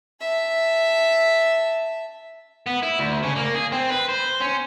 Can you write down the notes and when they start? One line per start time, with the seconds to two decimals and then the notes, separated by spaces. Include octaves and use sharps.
0.21 E5 A5
2.67 B3
2.83 E4
3.00 D2
3.23 C#3
3.36 A#3
3.55 G#4
3.72 C4
3.90 B4
4.09 C5
4.41 C#4